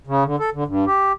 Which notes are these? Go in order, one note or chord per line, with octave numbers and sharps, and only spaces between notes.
C#3
D3
A4
D3
G2
G4